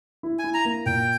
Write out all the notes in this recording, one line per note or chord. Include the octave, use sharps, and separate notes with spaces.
E4
G#5
E4
A#5
A#3
A#2 G5